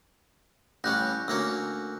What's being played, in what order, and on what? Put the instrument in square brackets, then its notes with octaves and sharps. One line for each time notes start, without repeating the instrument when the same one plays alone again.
[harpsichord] A1 G3 C#4 [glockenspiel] F#6 G6 A#6
[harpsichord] D2 A#3 C#4 [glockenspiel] E6